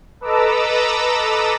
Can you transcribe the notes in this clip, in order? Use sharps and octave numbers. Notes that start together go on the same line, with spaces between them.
A4 B4 D#5 A#5 D6 E6